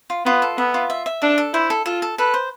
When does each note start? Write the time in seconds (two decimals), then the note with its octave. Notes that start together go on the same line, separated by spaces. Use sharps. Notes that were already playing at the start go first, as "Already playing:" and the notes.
0.10 F4
0.26 B3 F4
0.42 A4
0.57 B3 E5
0.74 F4
0.90 E5
1.06 E5
1.22 D4 A4
1.38 A4
1.53 E4 C5
1.70 A4
1.86 F4 A4
2.02 A4
2.18 A4 B4
2.34 C5